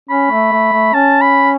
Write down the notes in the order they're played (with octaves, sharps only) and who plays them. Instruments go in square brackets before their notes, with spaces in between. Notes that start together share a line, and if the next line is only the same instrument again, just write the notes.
[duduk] C#4 [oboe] B5
[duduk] A3
A3
A3
[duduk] C#4 [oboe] A5
[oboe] B5